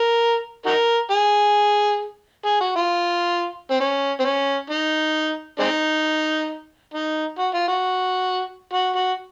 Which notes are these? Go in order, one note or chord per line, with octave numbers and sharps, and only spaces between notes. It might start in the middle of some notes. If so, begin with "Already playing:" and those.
Already playing: A#4
D#4 F#4 A#4
G#4
G#4
F#4
F4
C4
C#4
C4
C#4
D#4
G#3 C4 D#4
D#4
F#4
F4
F#4
F#4
F#4